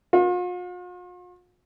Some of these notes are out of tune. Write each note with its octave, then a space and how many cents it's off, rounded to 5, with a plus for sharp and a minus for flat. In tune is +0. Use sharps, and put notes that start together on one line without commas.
F4 +45